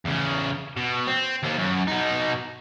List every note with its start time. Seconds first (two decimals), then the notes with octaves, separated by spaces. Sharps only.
0.05 E2 C#3
0.77 B2
1.07 C4
1.43 D#2 A#3
1.58 F#2
1.88 B2 D#4